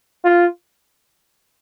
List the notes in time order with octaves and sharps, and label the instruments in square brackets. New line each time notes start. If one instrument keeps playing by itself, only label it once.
[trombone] F4